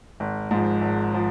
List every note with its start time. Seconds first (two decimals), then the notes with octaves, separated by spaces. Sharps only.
0.20 G#1
0.51 G#2 F3
0.81 G#1
1.14 F3